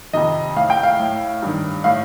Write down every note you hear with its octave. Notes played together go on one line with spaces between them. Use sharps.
F2 C3 D#3 D#5
A2 F5
G5
F5
A2
G2 D#3
A2 F5